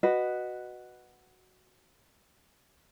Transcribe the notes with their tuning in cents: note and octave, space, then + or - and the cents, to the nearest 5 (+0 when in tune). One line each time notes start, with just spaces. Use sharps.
F#4 +0 B4 +0 D#5 -15